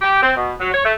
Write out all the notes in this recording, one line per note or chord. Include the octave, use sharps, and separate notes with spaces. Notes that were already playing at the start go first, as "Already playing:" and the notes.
G4
C4
B2
F#3
C#5
A3